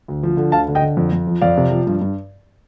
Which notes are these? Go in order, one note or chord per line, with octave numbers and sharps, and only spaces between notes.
D2
F3
D3
D2 F5 A5
D3
D#5 G5
D3
F2
F2
F3
F2 D5 F5
C3
F3
G2
G2